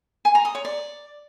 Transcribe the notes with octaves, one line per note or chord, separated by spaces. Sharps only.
G#5
A#5
D#6
C#5
D5